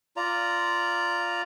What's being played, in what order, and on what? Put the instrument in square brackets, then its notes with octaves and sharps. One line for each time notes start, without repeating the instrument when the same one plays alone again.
[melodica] F4 D5 A#5